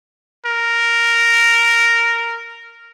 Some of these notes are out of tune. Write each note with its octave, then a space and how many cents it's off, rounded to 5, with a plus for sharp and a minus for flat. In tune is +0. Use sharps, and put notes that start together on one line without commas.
A#4 -5